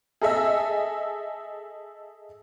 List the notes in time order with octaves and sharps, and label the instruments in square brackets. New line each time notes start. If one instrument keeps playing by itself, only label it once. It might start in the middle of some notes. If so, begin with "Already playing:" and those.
[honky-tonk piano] G#4 A4 D#5 E5